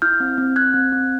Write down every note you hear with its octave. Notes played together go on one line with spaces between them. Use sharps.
E4 F6 G6
C4
C4
C4 F#6 G#6
C4
C4